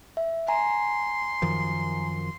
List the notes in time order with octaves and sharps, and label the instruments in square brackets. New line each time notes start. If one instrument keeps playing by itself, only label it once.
[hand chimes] E5
[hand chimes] G#5 A#5 [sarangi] C6
[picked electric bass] F#2 D#3 F3